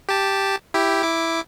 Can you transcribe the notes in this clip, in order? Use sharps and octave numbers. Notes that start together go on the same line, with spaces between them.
G4 A5
E4 G4
E4 D6